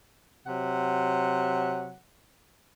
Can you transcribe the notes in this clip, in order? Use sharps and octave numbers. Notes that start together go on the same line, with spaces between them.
C3 F#3 F#5